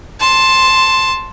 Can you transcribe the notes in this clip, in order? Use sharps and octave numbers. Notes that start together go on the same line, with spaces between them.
A5 C6